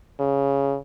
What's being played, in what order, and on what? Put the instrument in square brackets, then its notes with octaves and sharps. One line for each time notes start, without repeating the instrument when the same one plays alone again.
[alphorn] C#3